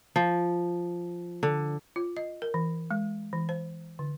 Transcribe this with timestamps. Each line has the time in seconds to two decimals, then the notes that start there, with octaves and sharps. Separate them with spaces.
0.16 F3
1.43 D3
1.96 F4
2.17 D#5
2.42 A#4
2.54 E3
2.91 G#3
3.33 E3
3.49 C5
3.99 D3